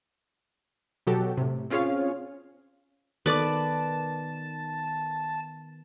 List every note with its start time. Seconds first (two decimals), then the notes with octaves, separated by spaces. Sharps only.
1.07 B2 F#3 F#4 G4 A4
1.37 A2 C3
1.70 C4 C#4 F4 G#4 C#5 F5
3.26 D#3 B3 A4 B4 D5 A5 D6